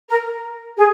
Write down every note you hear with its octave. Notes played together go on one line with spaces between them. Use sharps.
A#4
G#4